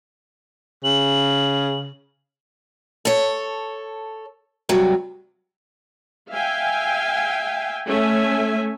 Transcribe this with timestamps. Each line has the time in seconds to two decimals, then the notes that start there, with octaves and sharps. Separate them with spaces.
0.84 C#3 F#7
3.05 A4 C#5
4.69 G2 C3 F#3
6.31 E5 F5 G5 G#5
7.87 A3 C#4 E5 G#5